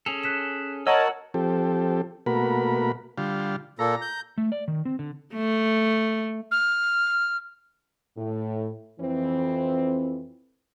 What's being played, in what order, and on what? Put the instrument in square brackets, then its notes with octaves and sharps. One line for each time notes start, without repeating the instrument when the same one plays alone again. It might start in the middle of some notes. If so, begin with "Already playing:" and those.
[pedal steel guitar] C#4 G#4 A4 [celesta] F7
[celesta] F#6 B6 E7
[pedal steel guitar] F#4 E6 [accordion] A#4 C#5 A5 [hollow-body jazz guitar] D#5 [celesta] F#5 F#7
[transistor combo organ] F3 C4 G4 A4
B2 A3 A#3 F#4 A#4 B5
D3 G3 F4
[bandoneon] A#2 A#3 A4 [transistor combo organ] A#5
[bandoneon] G6
[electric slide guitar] A3
D5
D#3
C4
D3
[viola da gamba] A3
[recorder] F6
[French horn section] A2
F2 E3 C4